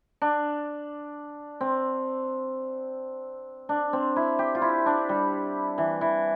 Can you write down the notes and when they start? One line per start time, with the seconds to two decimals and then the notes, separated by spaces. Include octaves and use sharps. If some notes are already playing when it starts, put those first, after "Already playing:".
0.22 D4
1.61 C4
3.69 D4
3.93 C4
4.16 E4
4.39 G4
4.55 F4
4.62 E4
4.86 D4
5.09 G3
5.78 E3
6.01 E3